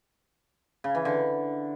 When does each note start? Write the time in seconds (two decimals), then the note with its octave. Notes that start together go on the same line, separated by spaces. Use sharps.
0.84 C#3
0.95 E3
1.05 D3